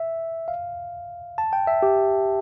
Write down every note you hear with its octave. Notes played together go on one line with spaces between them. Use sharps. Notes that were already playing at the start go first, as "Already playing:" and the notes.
Already playing: E5
F5
A5
G5
E5
G4